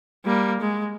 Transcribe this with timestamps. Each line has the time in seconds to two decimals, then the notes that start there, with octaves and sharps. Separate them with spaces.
0.25 G3 A#3
0.61 G#3